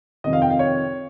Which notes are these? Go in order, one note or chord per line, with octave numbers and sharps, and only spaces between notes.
F2 C3 D#3 D#5
F5
G5
F5
C#5